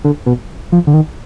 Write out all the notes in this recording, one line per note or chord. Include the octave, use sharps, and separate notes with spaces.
D3
B2
F3
D3
D#3